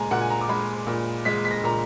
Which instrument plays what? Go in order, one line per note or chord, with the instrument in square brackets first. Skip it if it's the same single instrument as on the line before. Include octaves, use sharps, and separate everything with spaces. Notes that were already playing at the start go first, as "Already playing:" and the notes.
Already playing: [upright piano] A#2 G#3 G#5 A#5
A#2 F#5
G#5
A#5
D6
G#3 B5
A#2
G#3 B6
B6
A#6
A#2 A#5